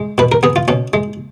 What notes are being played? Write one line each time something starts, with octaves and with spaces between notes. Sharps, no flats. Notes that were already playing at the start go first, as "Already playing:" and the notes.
Already playing: G#3
B2 B4
A#4
B3 G#4
F4
B2 C#4
G#3